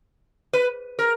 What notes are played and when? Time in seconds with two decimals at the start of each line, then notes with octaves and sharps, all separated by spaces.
0.53 B4
0.99 A#4